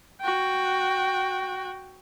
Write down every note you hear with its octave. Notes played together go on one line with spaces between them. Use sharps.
F#4 G5